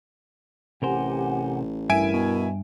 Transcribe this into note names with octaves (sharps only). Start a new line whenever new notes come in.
A1 C3 G4 A#4 C5 F#5 G#5
G2 E4 A#4 E5 G#5 D7
B2